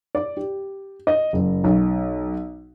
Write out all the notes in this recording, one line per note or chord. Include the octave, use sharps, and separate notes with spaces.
D5
G4
D#5
F#1
B1